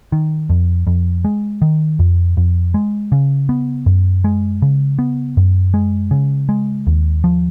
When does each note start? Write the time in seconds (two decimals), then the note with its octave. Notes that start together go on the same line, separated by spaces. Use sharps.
0.12 D#3
0.49 F2
0.87 F2
1.25 G#3
1.62 D#3
1.99 F2
2.37 F2
2.74 G#3
3.12 C#3
3.49 B3
3.86 F#2
4.24 G#3
4.62 C#3
4.99 B3
5.37 F#2
5.74 G#3
6.11 C#3
6.49 G#3
6.87 D#2
7.24 F3